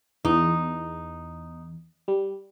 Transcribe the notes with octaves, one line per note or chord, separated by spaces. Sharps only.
E2 D#4
G3